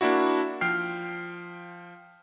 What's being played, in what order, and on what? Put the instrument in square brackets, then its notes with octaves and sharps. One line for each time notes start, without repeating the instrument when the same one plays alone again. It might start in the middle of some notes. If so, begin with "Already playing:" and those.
[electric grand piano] A#3 D4 E4 F#4
F3 G5 F6 C7